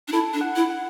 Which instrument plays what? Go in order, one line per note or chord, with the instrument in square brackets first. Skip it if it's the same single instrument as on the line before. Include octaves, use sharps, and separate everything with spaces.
[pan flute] D4
[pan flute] E4 [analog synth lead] A4
[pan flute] D4
[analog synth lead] F#5
[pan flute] E4
[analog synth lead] F#5